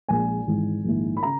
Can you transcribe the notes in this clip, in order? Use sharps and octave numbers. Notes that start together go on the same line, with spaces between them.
A#1 A#2 G#3 G#5
G#1 G#2 E3
A#1 G#2 D#3 A#3 E4
B5
C#3 A#5